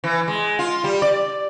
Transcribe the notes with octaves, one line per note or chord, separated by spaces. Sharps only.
E3
G#3
F4
G3
D5